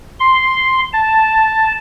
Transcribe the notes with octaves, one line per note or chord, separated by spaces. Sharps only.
C6
A5